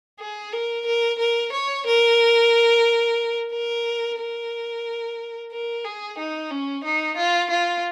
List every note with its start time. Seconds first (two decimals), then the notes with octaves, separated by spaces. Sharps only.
0.19 G#4
0.52 A#4
0.86 A#4
1.18 A#4
1.52 C#5
1.86 A#4
3.52 A#4
4.18 A#4
5.51 A#4
5.84 G#4
6.18 D#4
6.51 C#4
6.84 D#4
7.17 F4
7.50 F4